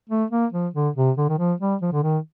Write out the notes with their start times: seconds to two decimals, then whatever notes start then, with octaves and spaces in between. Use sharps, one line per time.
0.09 A3
0.31 A#3
0.53 F3
0.74 D3
0.96 C3
1.18 D3
1.29 D#3
1.39 F3
1.60 G3
1.82 F3
1.93 D3
2.03 D#3